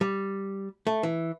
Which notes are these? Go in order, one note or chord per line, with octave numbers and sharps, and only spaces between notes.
G3
A3
E3